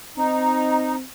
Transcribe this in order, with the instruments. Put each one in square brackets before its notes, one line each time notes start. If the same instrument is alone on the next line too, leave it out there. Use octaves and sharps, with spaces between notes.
[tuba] C4 [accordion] D#4 [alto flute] A#5